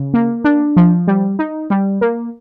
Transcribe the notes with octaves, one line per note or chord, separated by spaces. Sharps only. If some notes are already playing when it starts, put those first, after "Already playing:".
Already playing: C#3
A#3
D4
F3
G3
D#4
G3
A#3